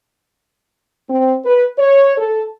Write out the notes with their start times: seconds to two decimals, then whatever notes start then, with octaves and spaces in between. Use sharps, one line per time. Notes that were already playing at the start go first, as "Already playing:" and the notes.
1.09 C4
1.45 B4
1.78 C#5
2.18 A4